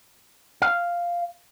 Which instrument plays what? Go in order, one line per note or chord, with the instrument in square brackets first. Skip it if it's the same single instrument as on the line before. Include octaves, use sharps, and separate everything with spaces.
[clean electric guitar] F5